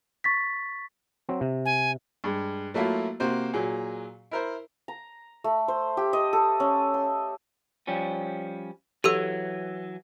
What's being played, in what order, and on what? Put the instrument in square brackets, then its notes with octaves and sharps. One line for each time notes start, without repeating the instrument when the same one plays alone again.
[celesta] C#6 A6 B6
[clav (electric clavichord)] F#3 C4
C3
[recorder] G#5
[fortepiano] G2 G#3
F#3 A3 A#3 E4 F4
C3 A#3 F#4 C5
A#2 F#3 G#4
E4 A#4 C5
[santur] A#5
A3
C5
G4
D#5
A4
C#4
C6
[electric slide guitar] F3 G3 C#4
[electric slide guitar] E3 F#3 [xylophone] G4 A4 E6